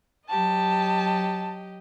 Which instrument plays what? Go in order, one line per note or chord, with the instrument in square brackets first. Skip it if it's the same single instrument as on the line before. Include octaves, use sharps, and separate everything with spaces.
[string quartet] F#3 G4 D#5 [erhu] A5